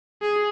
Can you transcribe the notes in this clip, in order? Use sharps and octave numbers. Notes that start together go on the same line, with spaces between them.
G#4